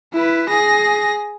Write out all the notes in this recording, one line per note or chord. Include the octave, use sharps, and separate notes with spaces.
E4 B4
G#4 A#6